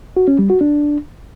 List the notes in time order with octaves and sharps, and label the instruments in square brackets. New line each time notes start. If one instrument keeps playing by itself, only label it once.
[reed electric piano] F#4
C#4
G3
F#4
D4